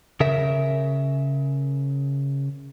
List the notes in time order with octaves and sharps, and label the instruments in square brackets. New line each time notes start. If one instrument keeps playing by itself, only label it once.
[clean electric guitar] C#3 A#4 E5